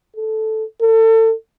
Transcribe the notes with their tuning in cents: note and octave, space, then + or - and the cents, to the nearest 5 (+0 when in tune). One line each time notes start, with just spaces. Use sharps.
A4 -5
A4 +30